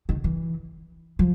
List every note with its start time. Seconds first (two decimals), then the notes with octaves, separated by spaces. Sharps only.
0.09 D#3
0.24 E3
1.19 F3